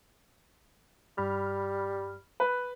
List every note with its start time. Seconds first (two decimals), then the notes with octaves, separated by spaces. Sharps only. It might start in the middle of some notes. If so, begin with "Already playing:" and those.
1.18 G2 G3 B5 F6
2.40 B4